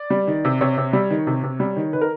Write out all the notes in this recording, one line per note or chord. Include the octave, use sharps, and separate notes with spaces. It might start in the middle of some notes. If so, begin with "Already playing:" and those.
Already playing: D5
G3
D#3
C3
C3 C#5
C3
G3
D#3
C3
C3
G3
D#3
D#3 B4
A#4